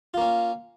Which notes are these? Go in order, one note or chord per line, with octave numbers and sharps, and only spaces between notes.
A#3 C#4 F4